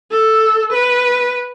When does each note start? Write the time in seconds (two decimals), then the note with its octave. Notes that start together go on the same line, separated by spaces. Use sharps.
0.11 A4
0.72 B4